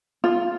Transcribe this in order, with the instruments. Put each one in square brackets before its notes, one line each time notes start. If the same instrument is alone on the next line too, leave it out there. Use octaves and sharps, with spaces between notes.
[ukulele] F4